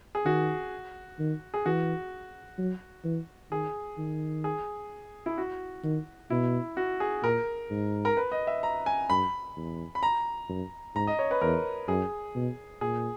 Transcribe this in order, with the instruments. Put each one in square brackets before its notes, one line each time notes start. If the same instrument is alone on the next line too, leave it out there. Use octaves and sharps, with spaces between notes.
[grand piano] G#4
[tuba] D#3 [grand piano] F#4
[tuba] D#3
[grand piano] G#4
[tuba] E3 [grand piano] F#4
[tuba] F#3
E3
[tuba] D#3 [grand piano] G#4
[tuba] D#3
[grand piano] G#4
E4
F#4
[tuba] D#3
[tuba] B2 [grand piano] E4
[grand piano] F#4
G#4
[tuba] A#2 [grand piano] A#4
[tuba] G#2
[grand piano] A#4
B4
D#5
E5
A#5
G#5
[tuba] F#2 [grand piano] B5
[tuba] E2
[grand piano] B5
A#5
[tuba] F#2
[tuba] G#2 [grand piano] A#5
[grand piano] D#5
C#5
B4
[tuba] E2 [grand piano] A#4
[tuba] F#2 [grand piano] G#4
[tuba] B2
[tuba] A#2 [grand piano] G#4